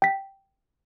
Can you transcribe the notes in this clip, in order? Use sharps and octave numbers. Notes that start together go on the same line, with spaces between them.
G5 B6